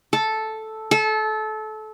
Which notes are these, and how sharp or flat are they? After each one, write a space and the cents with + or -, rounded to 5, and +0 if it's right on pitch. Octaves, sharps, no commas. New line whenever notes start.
A4 -5
A4 -25